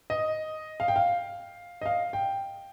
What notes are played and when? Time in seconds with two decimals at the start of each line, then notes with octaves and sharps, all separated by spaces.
0.10 D#5
0.80 F5
0.88 G5
0.96 F5
1.81 D#5
1.86 F5
2.13 G5